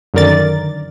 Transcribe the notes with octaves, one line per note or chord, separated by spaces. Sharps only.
F#2 D3 D#3 A#4 D5 A6